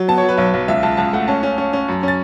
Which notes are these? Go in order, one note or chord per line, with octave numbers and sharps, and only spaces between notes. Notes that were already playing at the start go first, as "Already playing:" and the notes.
Already playing: F#3
B3 A5
C#5
F#3
B4
B1 C#5
B1
C#2 E5
C#2 A5
C#2 A5
A3 F#5
C#4 A5
C#4
C#4
C#4
F#2
C#4 A6